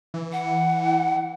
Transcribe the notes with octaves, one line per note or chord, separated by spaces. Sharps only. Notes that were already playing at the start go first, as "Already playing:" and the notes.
E3
F#5